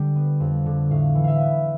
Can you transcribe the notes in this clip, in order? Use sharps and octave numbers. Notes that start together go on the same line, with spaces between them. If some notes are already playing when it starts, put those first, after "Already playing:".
Already playing: D3 G3
B3
F2
D3
A2 F5
E3
E5 F5
B3